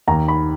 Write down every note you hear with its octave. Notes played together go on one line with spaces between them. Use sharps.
D#2 A#5
B5